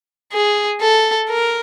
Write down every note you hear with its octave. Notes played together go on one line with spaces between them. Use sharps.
G#4
A4
A#4